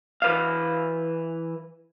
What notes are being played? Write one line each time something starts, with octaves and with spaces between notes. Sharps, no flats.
E3 B4 F5